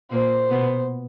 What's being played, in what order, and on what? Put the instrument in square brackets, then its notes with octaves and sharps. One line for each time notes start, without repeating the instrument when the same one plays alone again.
[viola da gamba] A#2 A#3 [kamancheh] C5
[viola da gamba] B2 B3